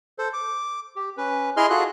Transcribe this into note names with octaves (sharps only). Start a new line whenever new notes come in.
A4 C5
D6
G4
C#4 B4
E4 G#4 D#5 G#5 C6 F6
F4 F#4 G#4 A4 F#6